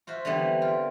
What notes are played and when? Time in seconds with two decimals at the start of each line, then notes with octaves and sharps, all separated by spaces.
0.07 F4 F#4 C5 E5
0.25 D3 E3 F3 G3 B3 C4
0.62 F4 A#4